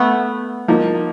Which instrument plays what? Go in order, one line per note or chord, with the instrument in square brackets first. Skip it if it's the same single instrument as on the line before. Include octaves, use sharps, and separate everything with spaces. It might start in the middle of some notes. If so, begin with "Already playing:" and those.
Already playing: [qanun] A3 B3
[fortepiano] F3 A#3 D#4